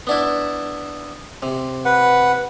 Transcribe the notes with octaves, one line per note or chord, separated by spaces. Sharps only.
B3 D4 E4
C3
B4 F#5